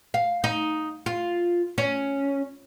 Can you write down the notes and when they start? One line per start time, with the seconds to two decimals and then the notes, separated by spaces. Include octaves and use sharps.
0.14 F5
0.44 D#4
1.06 F4
1.78 C#4